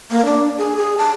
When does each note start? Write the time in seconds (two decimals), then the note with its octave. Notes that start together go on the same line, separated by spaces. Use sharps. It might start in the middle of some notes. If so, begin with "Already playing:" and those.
0.11 A#3
0.25 D4
0.58 G#4
0.76 G#4
0.98 A5